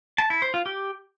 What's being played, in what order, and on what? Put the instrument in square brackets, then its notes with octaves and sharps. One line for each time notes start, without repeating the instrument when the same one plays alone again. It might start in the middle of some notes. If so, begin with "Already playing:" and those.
[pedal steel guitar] A5
E4
C5
F4
G4